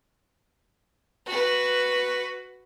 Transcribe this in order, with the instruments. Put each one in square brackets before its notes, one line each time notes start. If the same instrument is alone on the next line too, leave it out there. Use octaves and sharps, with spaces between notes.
[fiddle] F#4 B4